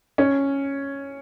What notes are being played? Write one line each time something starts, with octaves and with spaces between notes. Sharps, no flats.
C#4